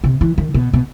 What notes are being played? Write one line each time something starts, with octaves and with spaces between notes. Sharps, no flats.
C3
E3
D#3
B2
B2